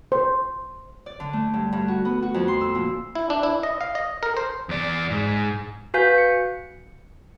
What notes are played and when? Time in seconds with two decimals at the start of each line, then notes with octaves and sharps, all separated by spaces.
0.12 C5
1.06 D5
1.20 D3
1.33 A3
1.54 G2
1.73 G2
1.88 F#4
2.05 B3
2.22 F#4
2.34 F2
2.48 C6
2.61 E6
2.75 A#2
3.15 E4
3.30 D4
3.43 E4
3.63 D#5
3.81 F5
3.95 D#5
4.23 A#4
4.37 C5
4.69 E2 D5
5.10 G#2
5.94 F#4 B4 F5 G#5 G6 B6
6.18 C#7